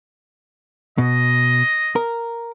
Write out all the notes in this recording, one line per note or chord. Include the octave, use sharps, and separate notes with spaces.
B2 D#5
A#4